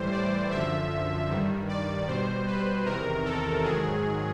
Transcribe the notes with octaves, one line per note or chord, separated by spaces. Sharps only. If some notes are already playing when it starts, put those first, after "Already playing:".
Already playing: A2 E3 G3 C5
D5
F#2 D3 F3 E5
G2 D#3 G3
D5
B2 G3 C5
B4
E2 C3 D#3 A#4
A4
G#2 D#3 F#3 G#4